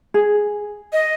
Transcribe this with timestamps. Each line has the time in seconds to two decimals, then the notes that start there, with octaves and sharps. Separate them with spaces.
0.14 G#4
0.93 D#5